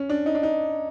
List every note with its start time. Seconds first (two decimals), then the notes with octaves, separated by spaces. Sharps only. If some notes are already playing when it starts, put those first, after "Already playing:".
Already playing: C#4
0.10 D4
0.26 D#4
0.35 D4
0.43 D#4